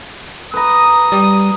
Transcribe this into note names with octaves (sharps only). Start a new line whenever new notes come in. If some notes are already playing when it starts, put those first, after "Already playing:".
B4 A#5 D#6
G3